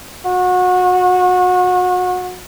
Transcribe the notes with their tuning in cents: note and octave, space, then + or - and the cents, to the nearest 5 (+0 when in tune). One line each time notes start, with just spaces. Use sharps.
F#4 -30